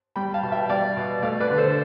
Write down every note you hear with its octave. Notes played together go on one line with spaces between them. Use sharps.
G3 G5 B5
F5 A5
B2
E5 G5
G3 D5 F5
B2
A3 D5 F5
B4 D5
D3
A4 C5